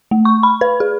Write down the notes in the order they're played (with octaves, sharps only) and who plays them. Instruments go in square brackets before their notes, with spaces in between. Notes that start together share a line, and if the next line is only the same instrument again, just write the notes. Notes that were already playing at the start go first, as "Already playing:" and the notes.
[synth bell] A3
C#6
B5
B4
G#4